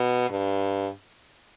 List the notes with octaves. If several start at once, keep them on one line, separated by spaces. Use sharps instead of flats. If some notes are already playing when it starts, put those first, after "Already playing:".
Already playing: B2
G2